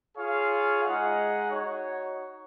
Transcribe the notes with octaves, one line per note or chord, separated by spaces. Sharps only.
F4 G#4 C#5 F5
G#3 D#4 G#4 D#5 F#5
D#4 F#4 C#5